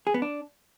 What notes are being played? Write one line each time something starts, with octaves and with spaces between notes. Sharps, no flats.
G#4
B3
D4